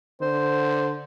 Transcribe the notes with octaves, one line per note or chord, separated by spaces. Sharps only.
D3 C5